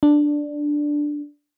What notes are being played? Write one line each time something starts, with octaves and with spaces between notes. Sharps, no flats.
D4